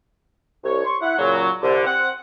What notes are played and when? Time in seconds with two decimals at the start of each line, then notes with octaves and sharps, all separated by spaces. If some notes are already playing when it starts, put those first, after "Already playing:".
0.64 C2 C#5
0.85 C6 C#6
1.02 E4 F#5
1.18 A#2 C#3 F#3
1.62 C2 D3
1.85 C4 F#5